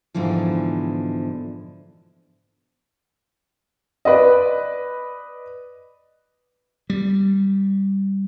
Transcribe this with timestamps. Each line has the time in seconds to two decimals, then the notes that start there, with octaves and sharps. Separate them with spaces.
0.14 G#2 B2 D3 E3 F3
4.05 B4 D5 D#5
6.90 G3